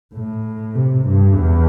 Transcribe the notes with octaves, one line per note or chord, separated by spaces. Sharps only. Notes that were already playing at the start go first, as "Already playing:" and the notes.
A2
C3
G2
E2